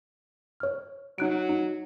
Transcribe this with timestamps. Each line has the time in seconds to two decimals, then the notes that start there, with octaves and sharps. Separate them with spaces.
0.60 C#5 F6
1.18 F#3 D#4 F#6 D7
1.49 D#4